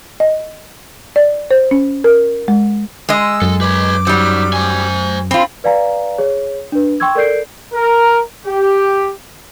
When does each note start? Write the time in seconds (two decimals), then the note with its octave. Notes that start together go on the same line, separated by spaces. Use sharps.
0.20 D#5
1.16 D5
1.51 C5
1.71 C#4
2.04 A#4
2.48 G#3
3.09 G#3 D#5 E6
3.42 F#2 A4
3.61 B4 C#5 D6
4.07 F#3 G3 D#4 C5
4.53 C5 G#5
5.31 C4 F4 B5
5.64 B4 D5 F5 G#5 A#5
6.18 G#4 C#5
6.72 D4 B4
7.00 G5 C6 C#6 E6 G#6
7.15 A4 A#4 D5 G6 C7 D7
7.73 A#4
8.46 G4